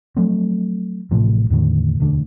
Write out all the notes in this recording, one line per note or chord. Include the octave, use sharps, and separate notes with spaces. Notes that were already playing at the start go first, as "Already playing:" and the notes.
F3 F#3 A3 C4
A1 A2 C3 F3
E2 A2 D3 D#3
E1 D2 D3 D4